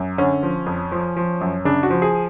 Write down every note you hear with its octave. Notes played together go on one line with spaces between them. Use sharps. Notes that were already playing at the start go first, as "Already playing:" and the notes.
Already playing: F#2
D3 C#4
F3
F2
F3
F3
F#2
C#3 D4
F#4
F3
G#4